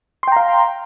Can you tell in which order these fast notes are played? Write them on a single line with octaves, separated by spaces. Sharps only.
C6 G5 A#5 F5